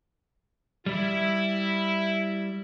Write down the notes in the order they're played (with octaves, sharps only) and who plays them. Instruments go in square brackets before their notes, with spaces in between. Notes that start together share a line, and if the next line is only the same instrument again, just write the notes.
[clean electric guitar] G3 [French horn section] E4